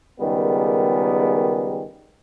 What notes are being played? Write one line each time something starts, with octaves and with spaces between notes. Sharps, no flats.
C#2 D#3 G3 B3 G#4 A#4